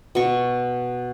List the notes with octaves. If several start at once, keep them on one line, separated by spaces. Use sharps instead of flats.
B2 C#6